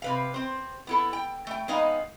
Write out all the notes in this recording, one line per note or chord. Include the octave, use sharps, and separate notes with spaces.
C3 B4 F5
C4 C5
B3 E4 A4
G5
A3 G5
G#3 B3 D#4 D#5 F5